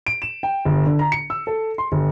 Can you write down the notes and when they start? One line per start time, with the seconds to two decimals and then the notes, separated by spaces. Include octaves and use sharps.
0.07 D7
0.22 E7
0.43 G5
0.65 G1
0.86 D3
0.99 A#5
1.12 C#7
1.30 E6
1.47 A4
1.78 C6
1.92 G1